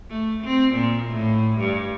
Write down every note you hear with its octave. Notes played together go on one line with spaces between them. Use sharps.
A3
C4
A#2
A2
G2